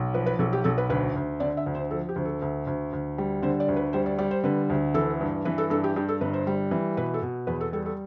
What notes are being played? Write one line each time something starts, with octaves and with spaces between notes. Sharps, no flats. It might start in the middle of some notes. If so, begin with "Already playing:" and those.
Already playing: B1
F3 B4
B4
B1 A4
G4
B1 A4
B4
D2 B4
D2
D3 D5
E5
D2
C5
F3 A4
G4
D2
A4
D2
D2
D2
G3
D3 C5
D5
D2
B4
G3 C5
D5
G3 D5
C5
D3 B4
D2
E3 A4
G2
E3 B4
A4
G2 A4
G4
G2 G4
A4
G1 B4
C5
G3
E3
B2 B4
A4
B2
E2 B4
A4
G3 A4
A4